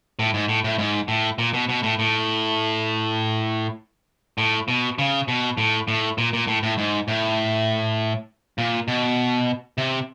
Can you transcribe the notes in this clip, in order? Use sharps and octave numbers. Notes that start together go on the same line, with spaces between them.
A2
G#2
A2
A2
G#2
A2
A#2
B2
B2
A2
A2
A2
B2
C#3
B2
A2
A2
A#2
A#2
A2
A2
G#2
A2
A#2
B2
C3